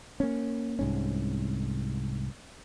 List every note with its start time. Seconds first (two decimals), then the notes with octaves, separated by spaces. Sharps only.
0.20 A#3 C#4
0.79 C2 G#2 C#4